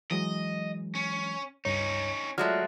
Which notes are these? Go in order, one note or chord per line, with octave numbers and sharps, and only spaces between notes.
E3 F#3 G#3 D#5
C#4
C#2 G2 C#4 D#4 C#5
F#3 G#3 A3 F4 D5 F6